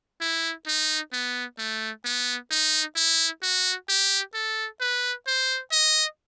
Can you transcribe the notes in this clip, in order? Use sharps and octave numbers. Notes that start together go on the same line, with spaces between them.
E4
D#4
B3
A3
B3
D#4
E4
F#4
G4
A4
B4
C5
D#5